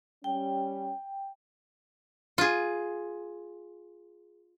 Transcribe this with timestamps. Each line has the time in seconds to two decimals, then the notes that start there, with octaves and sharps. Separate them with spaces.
0.24 G3 C#4 G5
2.38 F4 G#4